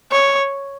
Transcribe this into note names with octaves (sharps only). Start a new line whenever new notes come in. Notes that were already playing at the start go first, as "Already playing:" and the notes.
C#5